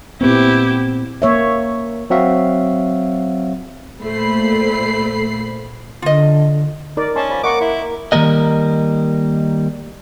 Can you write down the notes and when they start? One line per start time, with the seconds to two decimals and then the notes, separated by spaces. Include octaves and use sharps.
0.21 A#2 B3 C4 E4 G4
1.22 A#3 C#5 E5
2.10 F#3 C4 F#4 E5 F5
4.01 A#2 A3 C5 B5 C7
6.02 D3 F4 D#5
6.97 D#4 A#4 D5
7.16 C#4 D#5 A5 C6
7.30 F3 D5 A#5 B5
7.43 A#3 D#5 F#5 C#6 D6
7.61 E4 B5 C6
7.80 A#3
8.12 D#3 G3 A#3 A#4 D#5